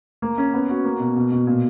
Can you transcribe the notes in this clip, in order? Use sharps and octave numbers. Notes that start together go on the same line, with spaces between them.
A#3
C#4
B3
F#4
A#3
B2
B2
B2
A#2